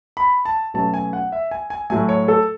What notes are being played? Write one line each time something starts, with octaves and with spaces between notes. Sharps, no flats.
B5
A5
B2 F#3 A3 C#4 A5
G#5
F#5
E5
G#5
G#5
A2 F#3 A3 G#5
C#5
A4